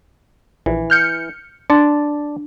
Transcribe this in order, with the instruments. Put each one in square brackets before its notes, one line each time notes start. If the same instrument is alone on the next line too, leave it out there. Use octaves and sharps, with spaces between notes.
[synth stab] A#1 [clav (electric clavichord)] E3
[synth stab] F6 G6 C#7
[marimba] D4 [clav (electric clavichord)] D5 A5